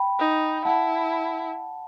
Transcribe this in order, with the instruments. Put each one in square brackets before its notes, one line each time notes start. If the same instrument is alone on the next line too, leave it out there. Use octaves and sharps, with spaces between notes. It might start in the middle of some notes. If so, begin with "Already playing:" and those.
Already playing: [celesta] G5 B5
[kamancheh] D#4
[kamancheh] E4 [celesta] F#5 A5